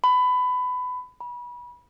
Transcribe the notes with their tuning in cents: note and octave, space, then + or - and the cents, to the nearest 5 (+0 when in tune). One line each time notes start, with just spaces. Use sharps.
B5 +20
B5 -25